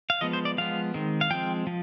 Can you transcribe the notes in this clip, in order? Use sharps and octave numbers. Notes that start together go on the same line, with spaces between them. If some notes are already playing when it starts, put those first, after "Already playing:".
F5
F3 G#3 B3 D#5
C5
D5
F3 G#3 B3 F5
D#3 G#3 C4
F5
F3 G#3 C4 G5
F3